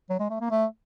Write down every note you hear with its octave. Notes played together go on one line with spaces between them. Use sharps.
F#3
G#3
A3
A#3
A3